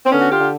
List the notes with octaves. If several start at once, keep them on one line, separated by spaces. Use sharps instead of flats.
C4
D3 B3 C#4
F#4
F4 G4
D3